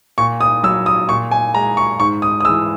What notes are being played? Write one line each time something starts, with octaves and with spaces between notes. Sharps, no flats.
A#2 C#6
D#6
F#3 E6
D#6
A#2 C#6
G#5
G#3 A#5
C#6
G#2 C#6
D#6
D#6
E3 G#3 E6